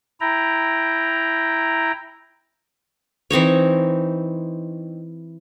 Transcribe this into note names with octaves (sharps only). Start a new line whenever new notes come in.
E4 G5 A#5
E3 C4 D#4 C#5